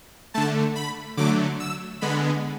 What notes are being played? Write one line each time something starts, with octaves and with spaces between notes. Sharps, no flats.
D3 A3 A5
B5
D3 F#3 A3 D6
E6
D3 G#3 B3 B5